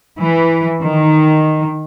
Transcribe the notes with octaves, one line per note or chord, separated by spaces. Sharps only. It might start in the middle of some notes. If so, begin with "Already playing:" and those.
E3
D#3